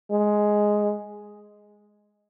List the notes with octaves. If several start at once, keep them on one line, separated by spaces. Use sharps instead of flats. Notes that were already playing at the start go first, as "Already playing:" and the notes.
G#3